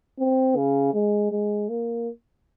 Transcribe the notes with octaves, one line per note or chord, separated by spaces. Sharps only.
C4
C#3
G#3
G#3
A#3